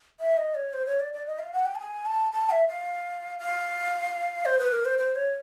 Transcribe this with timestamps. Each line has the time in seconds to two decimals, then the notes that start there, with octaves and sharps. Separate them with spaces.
0.20 E5
0.37 D#5
0.55 C#5
0.73 C5
0.86 C#5
1.00 D5
1.13 D5
1.26 D#5
1.39 F5
1.53 F#5
1.66 G5
1.75 A5
1.79 G#5
2.06 A5
2.32 A5
2.50 E5
2.68 F5
3.39 F5
4.45 C5
4.59 B4
4.72 A#4
4.85 C5
4.98 C5
5.16 C#5